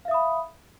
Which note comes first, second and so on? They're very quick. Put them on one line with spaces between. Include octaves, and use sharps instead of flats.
F5 E5 D#6 B5